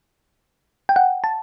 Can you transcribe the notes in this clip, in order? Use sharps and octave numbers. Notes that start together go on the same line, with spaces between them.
G5
F#5
A5